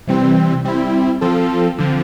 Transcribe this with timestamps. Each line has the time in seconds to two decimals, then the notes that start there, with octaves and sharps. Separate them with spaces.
0.07 C3 E3 G3 C4
0.65 G3 C4 E4
1.21 F3 C4 F4 A4
1.78 D3 F3 C4